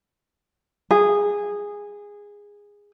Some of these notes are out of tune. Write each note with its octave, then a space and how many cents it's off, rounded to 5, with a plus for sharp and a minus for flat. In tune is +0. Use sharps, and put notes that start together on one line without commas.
G#4 -15